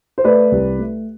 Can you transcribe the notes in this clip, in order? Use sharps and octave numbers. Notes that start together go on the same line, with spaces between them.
C5
A3 B4 D5
C2
A3